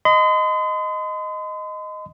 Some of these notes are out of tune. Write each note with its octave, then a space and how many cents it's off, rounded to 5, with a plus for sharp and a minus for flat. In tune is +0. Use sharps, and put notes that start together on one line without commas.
D#5 +0 C6 -45